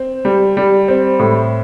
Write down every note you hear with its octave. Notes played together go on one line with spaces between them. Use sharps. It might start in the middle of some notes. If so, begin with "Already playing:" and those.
Already playing: C4
G3
G3
C4
A2